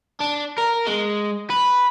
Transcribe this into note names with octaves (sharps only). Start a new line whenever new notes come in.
D4
A#4
G#3
B4